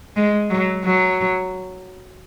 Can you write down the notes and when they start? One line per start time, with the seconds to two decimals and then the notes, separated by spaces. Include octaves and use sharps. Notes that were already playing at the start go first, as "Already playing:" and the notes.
0.16 G#3
0.50 F#3
0.84 F#3